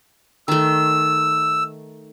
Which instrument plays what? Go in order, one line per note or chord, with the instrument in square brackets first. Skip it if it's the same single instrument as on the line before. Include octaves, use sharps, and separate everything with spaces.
[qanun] D#3 A3 [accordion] E6